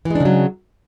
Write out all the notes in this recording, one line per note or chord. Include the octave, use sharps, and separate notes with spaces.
C#3 E3 F#3 G#3 D4